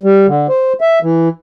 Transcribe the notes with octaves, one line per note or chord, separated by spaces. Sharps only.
G3
D3
C5
E5
E3